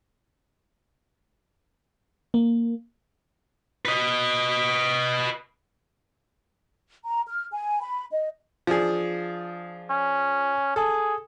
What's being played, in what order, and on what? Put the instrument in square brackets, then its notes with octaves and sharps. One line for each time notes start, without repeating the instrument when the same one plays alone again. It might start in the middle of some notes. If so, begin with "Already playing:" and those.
[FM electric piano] A#3
[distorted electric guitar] B4 D#5
[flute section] A#5
F6
G#5
B5
D#5
[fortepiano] F3 D4 G#4
[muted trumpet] C#4
[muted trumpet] G#4 [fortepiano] A4